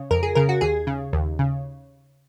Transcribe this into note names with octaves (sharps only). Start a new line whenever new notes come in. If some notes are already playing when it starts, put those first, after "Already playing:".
Already playing: C#3
F2 A#4
G#4
C#3 A#4
F#4
D#2 G#4
C#3
D#2
C#3